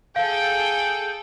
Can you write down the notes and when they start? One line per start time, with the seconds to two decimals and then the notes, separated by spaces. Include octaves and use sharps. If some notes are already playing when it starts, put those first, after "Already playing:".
0.16 G#4 A4 F5 G5